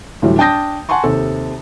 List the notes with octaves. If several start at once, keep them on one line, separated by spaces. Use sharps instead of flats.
D2 A2 E3 F#3 G3
D4 G5 A5 D#6 G6 A#6
F#5 G#5 A5 C6 C#6
D#2 C3 A4